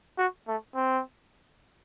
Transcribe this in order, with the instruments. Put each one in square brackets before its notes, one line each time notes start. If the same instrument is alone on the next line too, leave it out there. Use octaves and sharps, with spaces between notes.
[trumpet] F#4
A3
C4